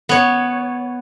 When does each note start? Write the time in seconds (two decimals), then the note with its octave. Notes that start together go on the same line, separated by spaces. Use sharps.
0.09 B3 C#5